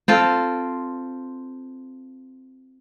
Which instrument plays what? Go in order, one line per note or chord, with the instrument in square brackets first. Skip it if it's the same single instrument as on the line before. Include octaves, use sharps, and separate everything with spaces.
[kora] C4 F4 A4